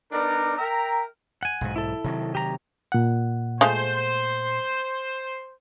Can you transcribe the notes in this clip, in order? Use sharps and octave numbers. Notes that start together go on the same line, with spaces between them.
B3 D4 D#4 A#4 D5 A#5
A#4 E5 G5 A#5
F#5 G#5
B1 G#2
E4 A4
C3 D#3 F#3
G4 A#5
A#2 F#5
G#3 A3 F4 C5